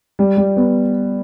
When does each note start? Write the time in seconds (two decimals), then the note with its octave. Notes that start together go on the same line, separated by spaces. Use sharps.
0.19 G3
0.37 G3
0.57 B3